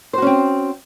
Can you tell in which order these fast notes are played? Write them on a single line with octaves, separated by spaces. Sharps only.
C5 F#4 C#4 C4